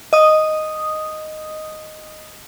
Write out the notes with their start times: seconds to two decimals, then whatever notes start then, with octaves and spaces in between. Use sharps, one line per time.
0.13 D#5 D#6